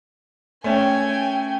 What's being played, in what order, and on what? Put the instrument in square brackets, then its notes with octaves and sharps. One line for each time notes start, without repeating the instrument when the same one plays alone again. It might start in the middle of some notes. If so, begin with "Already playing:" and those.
[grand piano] A3 C#4 [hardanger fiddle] G5 G#5